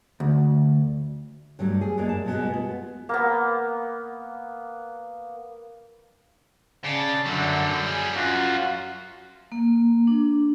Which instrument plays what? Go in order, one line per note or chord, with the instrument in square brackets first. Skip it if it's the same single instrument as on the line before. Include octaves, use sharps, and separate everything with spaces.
[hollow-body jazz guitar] D2
[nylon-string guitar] G2 F#3 G3 A3
G#4
F#2 G3 G#3 A#3 D5
A5
B2 G3 G#3 B3 F#4
B3 F4
[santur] A#3 B3
[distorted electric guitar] C#3 [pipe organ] D5 A5
[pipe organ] F#2 D3 [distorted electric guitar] F#3 G3
[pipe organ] G#4
[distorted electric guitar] F#2 [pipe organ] F4 F#4
[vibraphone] A#3
D4